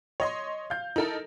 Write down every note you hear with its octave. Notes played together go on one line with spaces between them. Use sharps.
C#5 D#5 C6
F5 G6
D#4 E4 A4 A#4